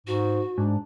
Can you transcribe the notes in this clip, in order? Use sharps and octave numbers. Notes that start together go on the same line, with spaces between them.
G#2 F#4
G#2 D4